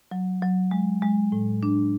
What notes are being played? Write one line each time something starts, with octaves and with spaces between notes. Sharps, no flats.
F#3
F#3
G#3
G#3
A2
D4